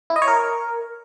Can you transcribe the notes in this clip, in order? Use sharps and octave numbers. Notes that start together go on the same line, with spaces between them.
E4
D#5
C#5
A#4